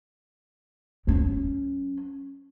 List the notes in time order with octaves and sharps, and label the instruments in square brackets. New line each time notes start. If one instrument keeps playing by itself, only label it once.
[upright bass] F#3 C#4